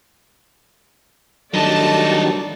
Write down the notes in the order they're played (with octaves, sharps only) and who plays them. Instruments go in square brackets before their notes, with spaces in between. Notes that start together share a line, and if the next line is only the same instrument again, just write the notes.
[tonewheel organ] D#3 F#3 G3 [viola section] A3 D5 [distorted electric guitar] D4 D#5 [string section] A5